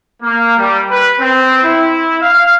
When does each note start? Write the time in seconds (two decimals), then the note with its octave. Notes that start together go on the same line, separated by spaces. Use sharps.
0.23 A#3
0.58 G3
0.90 B4
1.20 C4
1.63 E4
2.21 F5